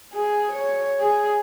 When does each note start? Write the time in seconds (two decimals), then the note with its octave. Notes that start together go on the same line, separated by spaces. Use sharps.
0.13 G#4
0.52 C#5
1.00 G#4